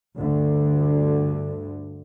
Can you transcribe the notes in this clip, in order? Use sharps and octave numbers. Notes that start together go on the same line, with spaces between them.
D2 G2 D3